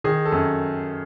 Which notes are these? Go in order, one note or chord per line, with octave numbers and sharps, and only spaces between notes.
D#3 G#4
A4
F#2